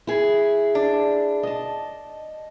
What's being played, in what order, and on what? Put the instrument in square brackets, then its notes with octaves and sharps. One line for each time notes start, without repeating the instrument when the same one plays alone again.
[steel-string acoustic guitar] E4 G#4
[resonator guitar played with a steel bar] D4
[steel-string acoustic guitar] D#5 A5